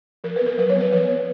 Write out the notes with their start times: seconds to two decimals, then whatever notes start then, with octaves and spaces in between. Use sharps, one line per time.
0.24 F3 A#4
0.36 B4
0.41 B3
0.46 A#4
0.58 F#3 B4
0.70 C#5
0.76 B3 B4
0.92 F3 B4
1.10 B3